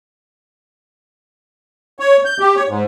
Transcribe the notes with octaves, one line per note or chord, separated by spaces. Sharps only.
C#5
G6
G4
C#5
G#2